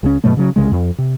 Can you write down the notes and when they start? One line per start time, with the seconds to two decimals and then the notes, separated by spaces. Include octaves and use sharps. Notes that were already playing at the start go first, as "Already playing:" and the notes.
0.03 C#2 C#3 E3 C#4
0.24 G2 B2 F#3 A3
0.37 C#3 F#3
0.56 C2 C#3 G#3
0.72 F2
0.98 C3